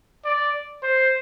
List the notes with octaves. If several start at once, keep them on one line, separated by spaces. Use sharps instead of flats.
D5
C5